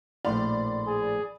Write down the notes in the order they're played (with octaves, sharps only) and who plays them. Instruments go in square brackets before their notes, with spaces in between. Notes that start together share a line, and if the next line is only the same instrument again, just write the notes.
[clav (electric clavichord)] A#1 A2 F5 [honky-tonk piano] D5 B5 [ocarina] C6
[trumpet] G#4